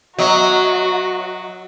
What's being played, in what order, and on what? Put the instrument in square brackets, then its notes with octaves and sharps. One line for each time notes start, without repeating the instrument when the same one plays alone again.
[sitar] F#3 [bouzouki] B3 C#5 A#5 [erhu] F#4 [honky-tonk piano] D#5 E5